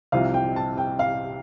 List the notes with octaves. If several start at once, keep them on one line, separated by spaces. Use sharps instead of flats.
C2 C3 F3 F5
G5
A5
G5
F5